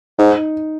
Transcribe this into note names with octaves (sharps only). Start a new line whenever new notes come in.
G#2 D#4